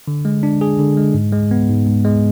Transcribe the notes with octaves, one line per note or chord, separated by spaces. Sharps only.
D3
G#3
D4
G#4
D3
G#3
G#2
G#3
B3
G#2
G#2
G#3